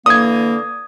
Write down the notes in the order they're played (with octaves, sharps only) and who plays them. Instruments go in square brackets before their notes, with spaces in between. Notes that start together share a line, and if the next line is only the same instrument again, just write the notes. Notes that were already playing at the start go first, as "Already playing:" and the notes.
[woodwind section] D3 E3 A#3 [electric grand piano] D#6 G#6